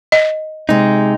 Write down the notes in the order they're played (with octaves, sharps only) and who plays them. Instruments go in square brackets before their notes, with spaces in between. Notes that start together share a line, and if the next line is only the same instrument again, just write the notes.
[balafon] D#5
[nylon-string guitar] C3 G#3 [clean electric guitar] D#4